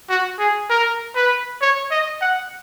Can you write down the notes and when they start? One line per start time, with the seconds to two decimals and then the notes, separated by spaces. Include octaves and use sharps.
0.09 F#4
0.39 G#4
0.70 A#4
1.15 B4
1.61 C#5
1.91 D#5
2.21 F#5